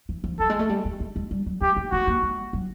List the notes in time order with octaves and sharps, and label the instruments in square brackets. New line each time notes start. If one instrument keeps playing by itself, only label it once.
[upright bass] E3
F3
[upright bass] F#3 [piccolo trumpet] A4
[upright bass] G#3
A3
G3
G#3
A3
G#3
G3
F#3
[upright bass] G#3 [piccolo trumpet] G4
[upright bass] A#3
[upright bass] A3 [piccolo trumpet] F#4
[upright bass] A#3
G#3
F#3